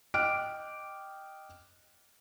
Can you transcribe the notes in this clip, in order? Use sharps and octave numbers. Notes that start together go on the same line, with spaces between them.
D#5 G5 D6 F6 F#6 D7